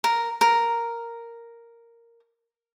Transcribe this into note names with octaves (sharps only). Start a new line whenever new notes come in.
A#4
A#4